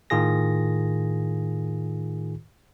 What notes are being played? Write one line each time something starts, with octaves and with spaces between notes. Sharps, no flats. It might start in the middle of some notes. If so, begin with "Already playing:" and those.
A2 D#3 F4 G#4 A#6